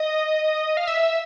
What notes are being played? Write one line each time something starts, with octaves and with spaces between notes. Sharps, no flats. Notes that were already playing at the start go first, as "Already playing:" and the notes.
Already playing: D#5
F5
E5